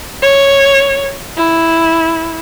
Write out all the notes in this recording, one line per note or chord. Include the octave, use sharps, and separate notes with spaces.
C#5
E4